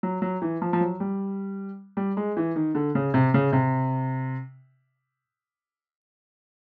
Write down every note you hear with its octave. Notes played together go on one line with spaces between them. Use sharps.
F#3
F#3
E3
F3
F3
F#3
G3
G3
G#3
E3
D#3
D3
C#3
C3
C#3
C3